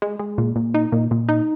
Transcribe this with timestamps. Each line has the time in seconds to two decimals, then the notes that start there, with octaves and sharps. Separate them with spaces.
0.02 G#3
0.19 G#3
0.38 A#2
0.56 A#2
0.74 D#4
0.92 A#2
1.11 A#2
1.29 D#4